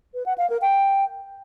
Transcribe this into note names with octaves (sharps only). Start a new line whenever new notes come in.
B4
F#5
F5
A#4
G5